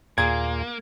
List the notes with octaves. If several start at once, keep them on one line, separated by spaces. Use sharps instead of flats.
D#2 A#2 A#3 G#4 G#6